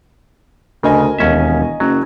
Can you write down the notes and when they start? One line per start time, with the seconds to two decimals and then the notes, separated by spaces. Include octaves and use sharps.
0.83 D2 C#3 A#4 D#5 G#5
1.19 E1 D#2 C#4 E5
1.80 F#1 F#3